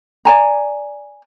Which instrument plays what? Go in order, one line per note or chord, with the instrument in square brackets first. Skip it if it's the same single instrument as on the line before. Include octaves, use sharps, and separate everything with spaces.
[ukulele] D5 G#5 A#5